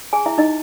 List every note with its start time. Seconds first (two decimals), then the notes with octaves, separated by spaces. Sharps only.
0.13 G#4 G#5
0.26 E4 E5
0.38 D#4 D#5